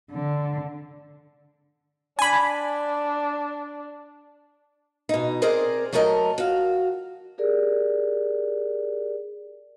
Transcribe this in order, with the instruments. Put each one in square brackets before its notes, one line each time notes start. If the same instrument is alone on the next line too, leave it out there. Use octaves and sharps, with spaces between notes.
[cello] D3
[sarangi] D4 [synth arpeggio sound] G#5 B5
[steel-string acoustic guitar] B2 D#4
C4 G#4 A#4 C5 D5 D#5
F#3 A3 A4 A#4 D#5
F#4 F5
[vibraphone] G4 G#4 A#4 D5